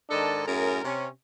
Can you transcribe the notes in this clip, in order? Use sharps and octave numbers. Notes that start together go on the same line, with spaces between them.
G#2 D#3 D4 A4 D#5 A5
F#2 A2 G#4 A#4
C3 C#4